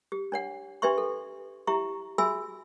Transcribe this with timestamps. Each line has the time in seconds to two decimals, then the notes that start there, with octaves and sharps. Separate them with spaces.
0.12 G4
0.32 D4 C#5 F#5
0.82 D4 G4 B4 E5 C6 C#6
0.98 A4
1.67 E4 G4 E5 A#5 C#6
2.18 F#4 G#4 E5 G#5 B5 E6